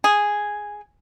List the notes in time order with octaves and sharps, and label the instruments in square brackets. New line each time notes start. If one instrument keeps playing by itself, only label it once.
[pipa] G#4